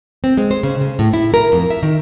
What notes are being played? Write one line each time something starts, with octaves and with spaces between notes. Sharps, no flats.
C4
G#3
C5
C#3
C#3
A2
E4
A#4
F2
E5
D#3